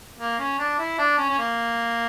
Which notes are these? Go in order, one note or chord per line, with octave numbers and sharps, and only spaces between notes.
A#3
C#4
D4
E4
D4
C#4
C#4
A#3